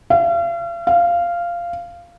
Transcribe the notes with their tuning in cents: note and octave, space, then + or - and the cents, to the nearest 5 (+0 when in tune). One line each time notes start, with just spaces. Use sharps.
F5 -40
F5 -10